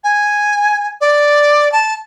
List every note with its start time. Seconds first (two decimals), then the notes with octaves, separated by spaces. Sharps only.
0.04 G#5
1.01 D5
1.72 A5